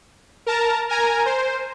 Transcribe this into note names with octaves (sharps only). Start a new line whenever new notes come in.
A#4 A5 A#5
A#4 G#5 A#5
C5